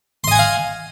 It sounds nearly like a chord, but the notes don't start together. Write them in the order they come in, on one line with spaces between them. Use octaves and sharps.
C6 D#5 G#5 F#5 F5